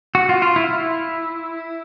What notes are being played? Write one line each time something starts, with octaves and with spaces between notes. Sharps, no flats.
F#4
F4
F4
E4
E4